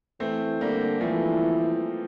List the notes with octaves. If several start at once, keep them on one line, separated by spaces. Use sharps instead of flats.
E3 A3 C4
D3 G3 A#3
E3 F3 A3